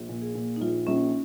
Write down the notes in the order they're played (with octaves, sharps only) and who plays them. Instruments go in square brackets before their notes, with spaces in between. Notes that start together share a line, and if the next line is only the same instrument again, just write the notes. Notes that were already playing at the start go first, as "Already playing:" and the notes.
Already playing: [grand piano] A#1
A#2
[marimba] G#4
[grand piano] A#2
[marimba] D#4
[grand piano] A#1 [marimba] F4
[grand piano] A#1 [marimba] C#4